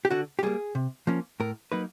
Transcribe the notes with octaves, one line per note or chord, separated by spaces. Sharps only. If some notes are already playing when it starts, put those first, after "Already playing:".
G4
D3 F#4
G4
G3 A#3 G#4
C3
F3 A#3 C#4
A2 A#4
F#3 A#3 D#4 B4